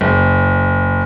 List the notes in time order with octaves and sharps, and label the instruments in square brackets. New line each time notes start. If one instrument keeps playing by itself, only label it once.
[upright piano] F#1